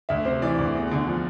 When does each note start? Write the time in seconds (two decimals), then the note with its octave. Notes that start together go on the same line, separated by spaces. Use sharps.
0.09 D2 E5
0.25 C3 C5
0.42 E3 D5
0.58 D2
0.75 E2
0.91 D3
1.07 F3